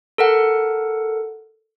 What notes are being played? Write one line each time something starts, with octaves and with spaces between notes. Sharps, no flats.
A4 A#4 F#5